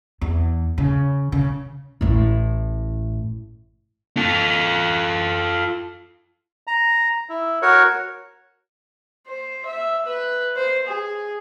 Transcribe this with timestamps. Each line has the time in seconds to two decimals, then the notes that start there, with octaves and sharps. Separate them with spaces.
0.21 E2
0.78 C#3
1.32 C#3
2.01 A1 A2
4.17 F4 A4
6.67 A#5
7.29 E4
7.62 F#4 A#4 C#5
9.27 C5
9.66 E5
10.06 B4
10.56 C5
10.87 G#4